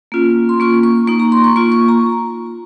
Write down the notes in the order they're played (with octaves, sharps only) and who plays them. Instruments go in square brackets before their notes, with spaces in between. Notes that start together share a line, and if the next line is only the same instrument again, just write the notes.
[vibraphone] A#3 C#4 F4
C6
A#3 F4 C#6
C#6
A#3 D#4 C#6
A#5
C6
C#6
A#3 F4 C#6
C#6
A#5